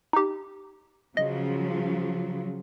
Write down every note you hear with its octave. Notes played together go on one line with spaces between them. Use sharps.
D#4 G4
C#3 F3 F#3 D#5